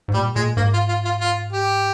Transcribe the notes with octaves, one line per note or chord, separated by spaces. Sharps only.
G#2
A#2 G3
A#2 G#3
G#2 A#3
F4
F4
F4
F4
G4